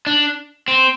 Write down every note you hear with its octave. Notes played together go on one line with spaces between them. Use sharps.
D4
C4